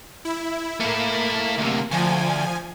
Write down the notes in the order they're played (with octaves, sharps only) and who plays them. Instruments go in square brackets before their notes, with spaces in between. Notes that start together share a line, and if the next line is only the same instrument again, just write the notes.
[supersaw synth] E4
[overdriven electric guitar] A3 E4 [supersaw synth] A#3
[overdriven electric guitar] D2 C3
[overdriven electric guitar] D2 [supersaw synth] F3 G#5